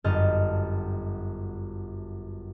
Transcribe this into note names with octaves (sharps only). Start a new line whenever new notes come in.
G1 F#2 D#5 A5 D#6 F6